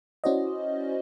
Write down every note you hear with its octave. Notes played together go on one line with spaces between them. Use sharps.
C#4 E4 F#4 C5 D5 D#5